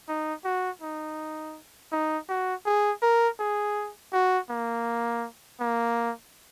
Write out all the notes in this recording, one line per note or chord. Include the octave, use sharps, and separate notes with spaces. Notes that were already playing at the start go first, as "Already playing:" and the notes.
D#4
F#4
D#4
D#4
F#4
G#4
A#4
G#4
F#4
A#3
A#3